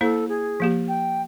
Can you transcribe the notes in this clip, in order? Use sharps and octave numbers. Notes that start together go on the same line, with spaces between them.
A#3 E4 A4 C5
G#4
F3 A#3 G4
G5